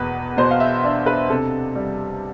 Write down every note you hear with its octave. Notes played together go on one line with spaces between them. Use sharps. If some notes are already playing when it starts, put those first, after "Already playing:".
Already playing: E2 B2 B4
B2 C5
F5
E5
D4
B4
C3 A4
G3